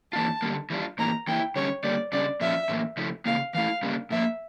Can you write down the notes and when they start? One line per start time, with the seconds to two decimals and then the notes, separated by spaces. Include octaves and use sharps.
0.13 E3 A#3 D4 F4 A5
0.42 D3 G3 A#3
0.70 E3 G3 D4 F4
0.99 A2 E3 A#3 A#5
1.28 E3 A#3 E4 G5
1.56 D3 G3 C#4 C#5
1.83 D3 G3 A#3 D5
2.12 C#3 G3 D4 D5
2.41 A#2 F3 C#4 F4 E5
2.69 A2 E3 A#3
2.97 C#3 F3 A3 E4
3.25 C#3 E3 A#3 F5
3.54 E3 A3 E4 F5
3.83 C#3 G3 A#3 D4
4.10 A2 F3 A#3 E5